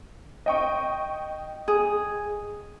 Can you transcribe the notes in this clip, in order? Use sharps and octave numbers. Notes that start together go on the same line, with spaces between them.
D#5 G5 C#6
G#4